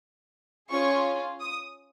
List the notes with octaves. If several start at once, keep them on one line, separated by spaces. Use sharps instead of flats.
C#4 F4 G#4 C#6
D#6